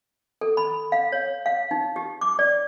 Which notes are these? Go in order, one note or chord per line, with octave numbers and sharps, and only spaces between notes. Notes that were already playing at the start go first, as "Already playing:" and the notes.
A4
B5
F5
C#5
F5
D#4
G4
D6
D5